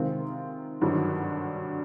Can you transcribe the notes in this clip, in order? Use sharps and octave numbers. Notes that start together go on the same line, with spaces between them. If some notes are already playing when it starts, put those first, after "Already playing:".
Already playing: C3 D#3 G#3 C4 F4
G#1 G2 D3 F#3